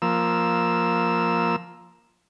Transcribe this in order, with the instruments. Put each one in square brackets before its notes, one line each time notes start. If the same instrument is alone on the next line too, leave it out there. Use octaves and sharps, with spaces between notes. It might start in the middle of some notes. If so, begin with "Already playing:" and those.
[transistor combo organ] F3 A#3 E6